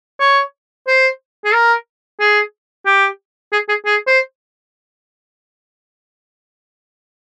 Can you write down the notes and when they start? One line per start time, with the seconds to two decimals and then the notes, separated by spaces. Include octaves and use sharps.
0.20 C#5
0.87 C5
1.45 G#4
1.53 A#4
2.20 G#4
2.86 G4
3.53 G#4
3.69 G#4
3.86 G#4
4.07 C5